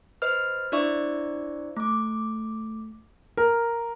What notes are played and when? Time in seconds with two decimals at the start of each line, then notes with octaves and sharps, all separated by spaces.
0.22 B4 C5 D#5 F6
0.72 D4 E4 C5 D5 E5 C#6
1.77 A3 D6
3.37 A#4